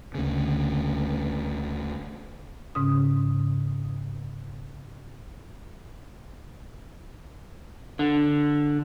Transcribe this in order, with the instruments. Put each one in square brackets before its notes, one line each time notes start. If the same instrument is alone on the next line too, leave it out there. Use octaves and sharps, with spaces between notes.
[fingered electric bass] D2 C#3
[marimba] G#2 C#3 C#4 D#6
[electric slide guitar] D3